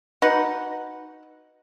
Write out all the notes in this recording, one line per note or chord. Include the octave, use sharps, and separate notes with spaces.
D#4 F#4 B4 F#5